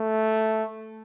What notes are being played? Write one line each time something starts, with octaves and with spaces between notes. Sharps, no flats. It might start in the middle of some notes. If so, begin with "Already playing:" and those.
Already playing: A3